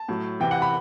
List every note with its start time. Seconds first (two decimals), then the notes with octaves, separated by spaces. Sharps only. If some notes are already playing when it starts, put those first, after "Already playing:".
Already playing: A5
0.09 A2 F#3
0.40 C3 E3 G5
0.51 F#5
0.62 B5